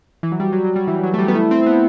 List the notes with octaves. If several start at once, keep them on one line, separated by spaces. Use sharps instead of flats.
E3
F#3
G3 F#4
F#3
F#3
G3
E3
F#3
A3
G3
B3
A3 E4
C4
B3